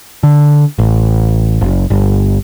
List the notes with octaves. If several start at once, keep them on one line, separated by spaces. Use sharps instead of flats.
D3
A1
F#1
G1